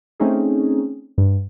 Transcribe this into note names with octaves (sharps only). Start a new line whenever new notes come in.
A3 C4 C#4 D#4 G#4
G2